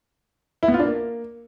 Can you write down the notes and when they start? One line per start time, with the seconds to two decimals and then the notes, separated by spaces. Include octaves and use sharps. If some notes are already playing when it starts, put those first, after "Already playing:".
0.63 E4
0.68 B3
0.74 F4
0.80 D4
0.85 A#3